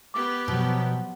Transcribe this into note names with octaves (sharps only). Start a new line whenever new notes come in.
B3 G4 D6
B2 F3 F#3